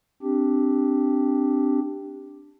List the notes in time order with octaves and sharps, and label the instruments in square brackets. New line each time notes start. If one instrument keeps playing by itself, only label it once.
[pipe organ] C4 D4 G4